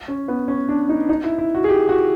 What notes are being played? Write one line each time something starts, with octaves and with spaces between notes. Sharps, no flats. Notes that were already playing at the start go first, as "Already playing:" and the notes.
C#4
B3
C#4
D4
D#4
D#4
E4
E4
F#4
G#4
G4
F#4